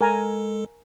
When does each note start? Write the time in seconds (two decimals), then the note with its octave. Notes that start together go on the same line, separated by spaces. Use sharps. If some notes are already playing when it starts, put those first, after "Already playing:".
0.01 G#3 A4 A#4 G#5 A#5